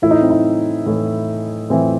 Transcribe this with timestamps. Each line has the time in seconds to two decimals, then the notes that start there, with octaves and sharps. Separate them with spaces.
0.02 A2 E3 E4
0.11 D#4
0.21 C4
0.30 D#4
0.86 A2 E3
1.70 A2 E3 C4